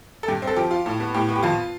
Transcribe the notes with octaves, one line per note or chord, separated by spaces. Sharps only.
A4
G2 G4
C4
A4
F3 G4
F4
A2
B3
A2 G4
B3
G4
F2 F4